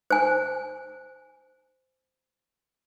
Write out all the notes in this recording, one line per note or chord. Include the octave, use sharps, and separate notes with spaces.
C5 G#5